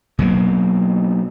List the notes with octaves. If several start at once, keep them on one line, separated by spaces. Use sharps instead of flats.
B2 F#3 A#3